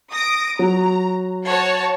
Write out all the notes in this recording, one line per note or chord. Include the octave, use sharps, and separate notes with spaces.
D#6 A#6 D7
F#3 A#5
F#4 C#5 A5